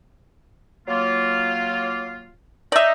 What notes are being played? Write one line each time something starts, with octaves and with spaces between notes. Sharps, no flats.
F#3 A#3 F4
D#4 D5 E5